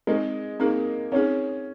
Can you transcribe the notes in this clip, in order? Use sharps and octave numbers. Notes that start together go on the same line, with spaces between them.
G#3 C4 D#4 G#4
A#3 C4 D#4 G#4
C4 C#4 D#4 G#4